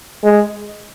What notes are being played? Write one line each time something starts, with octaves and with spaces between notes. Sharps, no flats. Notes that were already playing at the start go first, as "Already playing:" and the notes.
G#3